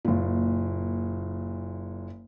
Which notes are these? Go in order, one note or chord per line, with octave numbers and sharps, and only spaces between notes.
F#1 A#2